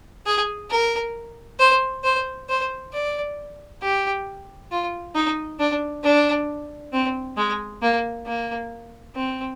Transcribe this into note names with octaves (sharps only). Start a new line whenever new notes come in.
G#4
A#4
C5
C5
C5
D5
G4
F4
D#4
D4
D4
C4
G#3
A#3
A#3
C4